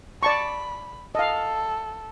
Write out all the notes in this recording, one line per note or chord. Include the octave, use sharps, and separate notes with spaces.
D5 A5 B5 C#6
A4 D#5 F5